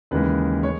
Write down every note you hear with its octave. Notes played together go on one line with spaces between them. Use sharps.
D#2 C#3 E3 G#3 B4
G#3 C#5